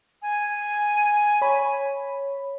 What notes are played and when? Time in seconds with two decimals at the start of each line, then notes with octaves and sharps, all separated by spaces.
0.22 G#5
1.42 C#5 B5